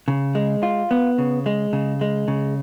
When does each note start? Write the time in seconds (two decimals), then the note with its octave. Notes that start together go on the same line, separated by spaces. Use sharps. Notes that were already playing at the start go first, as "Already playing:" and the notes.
0.08 C#3
0.35 G#3
0.63 F4
0.91 B3
1.18 C#3
1.46 G#3
1.73 C#3
2.01 G#3
2.28 C#3